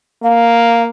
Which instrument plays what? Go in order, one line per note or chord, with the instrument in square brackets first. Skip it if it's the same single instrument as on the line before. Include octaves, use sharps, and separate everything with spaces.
[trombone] A#3 [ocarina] F5